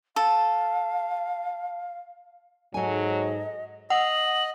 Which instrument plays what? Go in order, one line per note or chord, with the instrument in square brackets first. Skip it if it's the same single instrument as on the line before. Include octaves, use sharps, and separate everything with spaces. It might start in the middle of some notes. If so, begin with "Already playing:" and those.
[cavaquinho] A4 [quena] F5
[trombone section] G#2 [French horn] F#3 [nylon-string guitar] A4 G#5 [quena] D#5
[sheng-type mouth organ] D#5 [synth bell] F#5 [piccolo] F#7